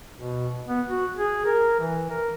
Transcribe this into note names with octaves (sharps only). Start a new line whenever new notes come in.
B2
B3
F#4
G#4
A#4
E3
A#4